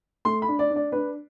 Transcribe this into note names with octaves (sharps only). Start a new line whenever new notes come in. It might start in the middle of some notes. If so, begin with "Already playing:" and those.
A3 C6
B5
D4
D5
D4
D5
D4 B4